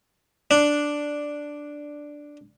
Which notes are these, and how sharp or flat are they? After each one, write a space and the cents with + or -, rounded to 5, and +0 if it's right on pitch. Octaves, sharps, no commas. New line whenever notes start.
D4 +0